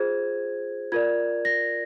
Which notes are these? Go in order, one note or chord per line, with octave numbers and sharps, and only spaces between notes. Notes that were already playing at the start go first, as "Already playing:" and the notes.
Already playing: F4 G#4 C5 G#6
F4 A#4 D5 G#6
A#6